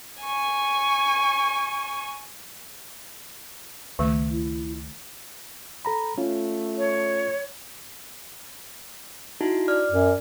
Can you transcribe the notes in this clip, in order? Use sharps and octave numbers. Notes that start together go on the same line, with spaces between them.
G#5 C#6
C#2 D#3 A3
E4
A4 A#5 B5
A3 C#4 F4
C#5
D#4 E4 F#4
D5 F6
F#2